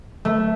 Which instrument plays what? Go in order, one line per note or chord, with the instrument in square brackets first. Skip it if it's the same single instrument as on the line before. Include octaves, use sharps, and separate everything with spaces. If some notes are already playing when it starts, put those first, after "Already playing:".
[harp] A3